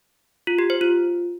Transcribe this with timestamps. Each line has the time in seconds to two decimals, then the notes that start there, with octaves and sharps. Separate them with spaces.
0.47 F4
0.59 G4
0.70 C5
0.81 F4